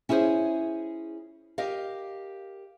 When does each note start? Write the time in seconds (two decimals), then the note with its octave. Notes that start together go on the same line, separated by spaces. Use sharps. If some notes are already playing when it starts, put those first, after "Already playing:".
0.09 C#4 E4 G#4 A4 C5 C#5
1.58 G4 A#4 D#5 F5